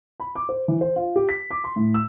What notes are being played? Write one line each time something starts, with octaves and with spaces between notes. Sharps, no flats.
B5
D6
C5
E3
C5
F4
G4
B6
D6
C6
A2
E6